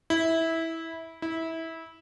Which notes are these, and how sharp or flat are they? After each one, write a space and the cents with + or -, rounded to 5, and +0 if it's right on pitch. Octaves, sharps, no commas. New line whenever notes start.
E4 -15
E4 -20